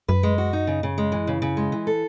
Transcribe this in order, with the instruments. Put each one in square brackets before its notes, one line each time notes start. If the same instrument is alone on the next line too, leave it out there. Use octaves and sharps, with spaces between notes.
[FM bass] F#2 [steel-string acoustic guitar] B4
[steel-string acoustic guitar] G#3
F#4
D#4
C#3
C#3
G#3
E3
C#3
C#3
G#3
E3
A4